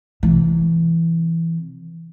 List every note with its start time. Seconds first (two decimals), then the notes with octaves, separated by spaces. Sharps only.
0.23 C3 E3